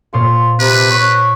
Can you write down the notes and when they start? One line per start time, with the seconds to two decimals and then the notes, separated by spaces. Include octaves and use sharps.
0.13 A#2 F4 C5 C#6
0.60 C3 B4
0.91 C#5